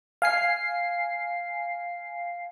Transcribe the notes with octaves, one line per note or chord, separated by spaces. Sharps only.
F5 G#5 C7